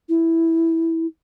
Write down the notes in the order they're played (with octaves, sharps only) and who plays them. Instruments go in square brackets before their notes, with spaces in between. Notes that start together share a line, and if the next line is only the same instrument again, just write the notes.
[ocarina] E4